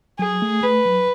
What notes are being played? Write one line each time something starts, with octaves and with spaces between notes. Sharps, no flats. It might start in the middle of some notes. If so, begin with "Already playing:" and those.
F#3 G#4
A3
A3 B4
F#3